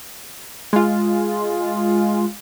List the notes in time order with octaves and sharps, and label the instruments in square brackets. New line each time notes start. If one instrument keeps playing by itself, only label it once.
[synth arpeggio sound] G#3 F4